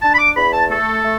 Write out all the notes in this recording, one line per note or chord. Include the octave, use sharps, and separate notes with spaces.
D4 A5
B5
D6
E2 B5
A5
A3 A4
A3